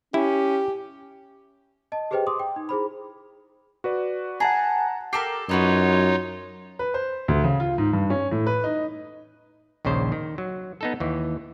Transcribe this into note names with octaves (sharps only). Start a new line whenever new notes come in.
C#4 E4 G4
D#5 A5
G4 G#4 B4 C5 D#5 G5
C6 D6 D#6
G5
D#4
E4 G#4 C5 B5
F#4 B4 D5
G#4 F#5 A5 A#5
G4 A4 A#4 C7
F#2 D#4 F4 F#4 B4 C#5 D#5
B4
C5
D2
C#3
F4
G#2
G2
C#4
A2
B4
D#4
A#1 D#2 C#3 C5
D#3
F#3
B3 D#4 A4
D#2 E3